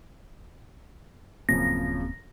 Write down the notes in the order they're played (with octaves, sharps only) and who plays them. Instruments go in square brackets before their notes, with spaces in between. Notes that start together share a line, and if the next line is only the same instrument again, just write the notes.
[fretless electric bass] D1 A#3 C4 [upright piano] F#2 C#3 F3 [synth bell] A#6